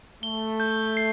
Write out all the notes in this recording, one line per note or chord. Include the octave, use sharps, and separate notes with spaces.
A3 G7
G6
C7